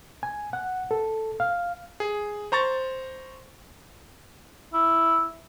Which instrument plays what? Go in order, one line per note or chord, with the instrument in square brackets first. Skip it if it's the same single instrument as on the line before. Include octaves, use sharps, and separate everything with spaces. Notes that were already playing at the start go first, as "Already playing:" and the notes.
[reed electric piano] G#5
F#5
A4
F5
[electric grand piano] G#4
C5 A#5 C#6 A6
[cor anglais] E4